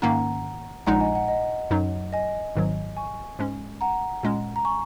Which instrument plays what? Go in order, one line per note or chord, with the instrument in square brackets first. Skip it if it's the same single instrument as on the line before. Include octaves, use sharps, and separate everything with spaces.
[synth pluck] G#2 D#3 A#3 C#4 [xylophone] F#5 A#5
[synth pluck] A#1 A#2 G#3 D#4 [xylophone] F#5 A#5
[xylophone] D#5 G#5
F#5
D#5
[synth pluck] F#2 F#3 D#4
[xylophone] D#5 G#5
[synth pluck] G#1 G#2 D#3 F#3
[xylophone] G#5 C#6
[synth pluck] G#2 G#3 C#4
[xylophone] F#5 A#5
[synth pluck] A#2 G#3 C#4
[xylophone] A#5
G#5 C#6